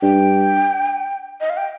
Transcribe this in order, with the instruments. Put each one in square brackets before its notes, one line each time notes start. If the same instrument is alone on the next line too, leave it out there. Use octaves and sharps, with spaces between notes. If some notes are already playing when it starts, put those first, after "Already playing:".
[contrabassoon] G2 [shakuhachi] G5
[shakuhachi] D#5
F5
G5